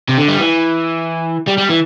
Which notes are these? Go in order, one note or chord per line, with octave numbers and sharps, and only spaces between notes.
C3
D3
G3
E3
G3
G3
E3